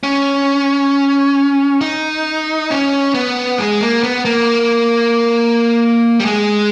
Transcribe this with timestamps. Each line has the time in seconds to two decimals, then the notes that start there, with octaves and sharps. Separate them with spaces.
0.03 C#4
1.81 D#4
2.70 C#4
3.14 B3
3.58 G#3
3.81 A#3
4.03 B3
4.25 A#3
6.20 G3
6.25 G#3